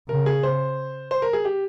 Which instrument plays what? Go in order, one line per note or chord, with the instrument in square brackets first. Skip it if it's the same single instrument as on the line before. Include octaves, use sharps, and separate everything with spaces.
[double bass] C#3 [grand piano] A#4
[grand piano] G#4
C5
C5
A#4
G#4
G4